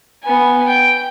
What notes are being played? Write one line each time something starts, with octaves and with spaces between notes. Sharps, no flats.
B3 G#5
G5